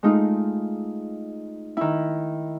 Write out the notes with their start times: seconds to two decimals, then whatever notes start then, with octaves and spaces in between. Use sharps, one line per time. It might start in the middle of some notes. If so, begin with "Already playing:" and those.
0.03 G#3 A3 D#4 F4
1.77 D#3 E4